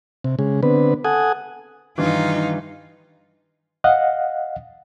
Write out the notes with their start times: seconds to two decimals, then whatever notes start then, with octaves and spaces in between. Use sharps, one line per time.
0.24 C3
0.39 C#3 G#3
0.63 D3 B3 C4 B4
1.04 A4 F#5 G#5 D#6
1.98 G2 D#3 E3 D#4 F4
3.84 D#5 F5 F#5